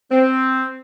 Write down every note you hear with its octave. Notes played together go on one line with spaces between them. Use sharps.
C4